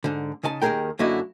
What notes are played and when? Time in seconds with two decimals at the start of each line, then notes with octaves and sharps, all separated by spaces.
0.04 G#2 D3
0.43 C#3 D#4 G#5 A5
0.62 D#2 D#3 F3 G#4 A#4 G5
0.99 F#2 D3 A#3 E4 F#4 D#5